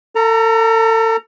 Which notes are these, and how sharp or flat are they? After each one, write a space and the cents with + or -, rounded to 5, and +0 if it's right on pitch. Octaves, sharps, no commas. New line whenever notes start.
A4 +35 A#5 +0